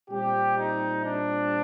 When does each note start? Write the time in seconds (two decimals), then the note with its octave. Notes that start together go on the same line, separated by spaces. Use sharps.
0.10 A#2 G3 C4 G4
0.58 D#4
1.06 D4